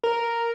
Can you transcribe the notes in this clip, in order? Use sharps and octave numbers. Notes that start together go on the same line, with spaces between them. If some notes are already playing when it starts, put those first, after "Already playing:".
A#4